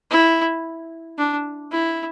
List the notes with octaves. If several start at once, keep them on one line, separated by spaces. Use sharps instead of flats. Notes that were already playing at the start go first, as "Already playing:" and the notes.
E4
D4
E4